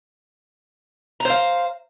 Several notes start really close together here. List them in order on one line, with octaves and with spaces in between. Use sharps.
A#5 C5 F5